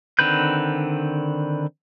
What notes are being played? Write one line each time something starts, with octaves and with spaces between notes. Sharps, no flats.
D3 D#3 C4 B4 G6